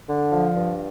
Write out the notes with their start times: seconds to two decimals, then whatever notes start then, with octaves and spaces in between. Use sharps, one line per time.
0.08 D3
0.32 F3
0.56 G2